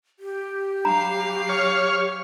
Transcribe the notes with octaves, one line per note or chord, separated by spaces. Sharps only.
G4
F#3 D4 F5 A#5 B5
C#5 F6